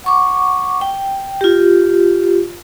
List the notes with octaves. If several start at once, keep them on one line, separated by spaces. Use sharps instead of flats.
F#5 C#6 D6
G5
F4 G4